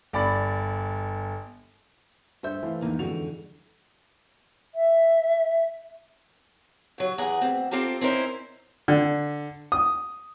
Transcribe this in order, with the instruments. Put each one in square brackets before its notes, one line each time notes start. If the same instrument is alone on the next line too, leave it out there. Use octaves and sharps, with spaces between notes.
[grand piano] G1 D5 B5 A6
[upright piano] D2 G2 G6 [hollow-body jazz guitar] C5 [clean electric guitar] E5
[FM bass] E3 [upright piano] A3 F5
[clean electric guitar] E2 D#4 [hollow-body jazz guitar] A#3
[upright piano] F2 G#2 F7 [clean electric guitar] D3 [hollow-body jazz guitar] F#4
[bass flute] E5
[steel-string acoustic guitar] C#3 F#3
E2 G#4 F#5 A#5
D2 C4
C4 F4 G4 A4 A#4
C4 C#4 D#4 E4 A#4 C5
[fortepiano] D3
D#6